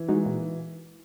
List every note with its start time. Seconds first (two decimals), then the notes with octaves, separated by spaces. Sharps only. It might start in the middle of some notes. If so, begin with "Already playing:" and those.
Already playing: E3
0.08 G#3 D#4 F#4
0.26 A#2